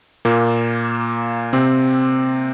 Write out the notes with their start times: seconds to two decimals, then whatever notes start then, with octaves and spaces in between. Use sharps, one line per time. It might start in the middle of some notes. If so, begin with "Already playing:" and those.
0.25 A#2 A#3
1.53 C3 C4